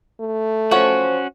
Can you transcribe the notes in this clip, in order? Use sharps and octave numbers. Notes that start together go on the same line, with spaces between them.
A3
F3 C#4 F#4 C5 C#5 F#5